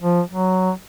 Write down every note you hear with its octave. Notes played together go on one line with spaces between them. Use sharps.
F3
F#3